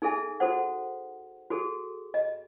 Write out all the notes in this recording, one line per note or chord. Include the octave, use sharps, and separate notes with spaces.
D#4 G#4 A4 E5 G#5
F#4 A4 C5 F#5
F#4 G#4 A4
D#5